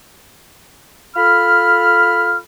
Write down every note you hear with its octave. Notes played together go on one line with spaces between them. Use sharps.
F4 A4 B5 F6